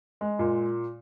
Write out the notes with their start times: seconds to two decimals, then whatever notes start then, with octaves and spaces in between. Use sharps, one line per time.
0.21 G#3
0.39 A#2